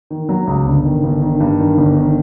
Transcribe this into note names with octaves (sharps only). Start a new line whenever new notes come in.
D#3
F#3
C#2
G1
D#3
G1
D#3
G2
D#3
G1
D#3